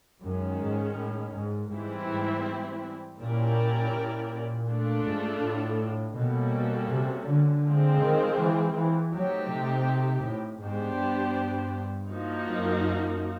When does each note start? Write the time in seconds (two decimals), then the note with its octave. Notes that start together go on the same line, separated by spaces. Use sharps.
0.22 F#2 D#3 G#3 C#4
0.60 G#2
0.97 A2
1.34 G#2
1.70 G#2 E3 G3 C4 E4
2.08 G#2
3.19 A#2 C#4 E4 G4 A#4 D5
3.94 A#2
4.68 A3 D4 F4 A4
5.05 G#2
5.41 A2
6.16 B2 G3 A#3 C#4 F#4 A4
6.89 C3
7.27 D3
7.64 F3 G#3 C4
8.01 D#3
8.39 E3
8.75 E3
9.12 F#3 A3 C4 D#4 G4
9.50 C3
10.24 A2
10.61 G#2 B3 D4 G4 C5
10.97 G2
12.09 F3 A#3 D#4 F#4
12.47 F#2